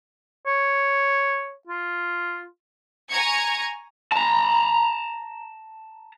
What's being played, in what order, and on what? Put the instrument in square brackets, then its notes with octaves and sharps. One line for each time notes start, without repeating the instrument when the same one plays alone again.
[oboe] C#5
F4
[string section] G#5 A#5 C#6 G#6 C#7
[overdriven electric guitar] A5 A#5